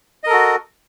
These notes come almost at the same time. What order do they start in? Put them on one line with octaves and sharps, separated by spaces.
D#5 A#4 A4 F#4